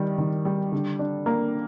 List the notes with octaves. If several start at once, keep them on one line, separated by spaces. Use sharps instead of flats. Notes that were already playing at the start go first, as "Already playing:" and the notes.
Already playing: D#3 G3
D#3
G3
D3
D4
A#3